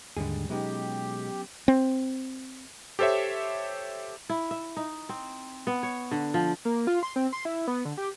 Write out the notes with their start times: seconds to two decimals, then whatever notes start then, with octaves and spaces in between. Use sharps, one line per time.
0.17 D#2 G#2 D3 G3 G#3 G#4
0.49 B2 F#3 G#3 B3 C#4 D#4 G4
1.68 C4
2.99 G4 A4 C5 C#5 E5
4.29 E4
4.51 E5
4.77 D#4
5.09 C4
5.67 B3
5.83 C#5
6.11 D3
6.34 F3
6.65 A#3
6.87 F4
7.03 C6
7.16 C4
7.33 C6
7.45 E4
7.67 B3
7.85 D3
7.97 G4